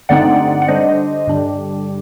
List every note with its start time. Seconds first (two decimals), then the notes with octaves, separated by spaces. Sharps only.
0.09 G2 D3 A3 C4 D#4 D5 F#5
0.62 F#5
0.68 D3 G3 D4 C5 D#5
1.27 G2 D3 G3 D4